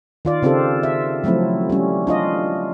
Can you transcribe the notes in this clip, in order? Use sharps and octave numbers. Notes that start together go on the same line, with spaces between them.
D#3 F4 D5
C#3 C4 F4 G4 A4
E5
F3 F#3 A3 C4 E4
G3 C#4
D4 F4 D#5